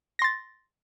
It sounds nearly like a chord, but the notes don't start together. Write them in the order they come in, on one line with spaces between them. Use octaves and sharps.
A#6 C6 A6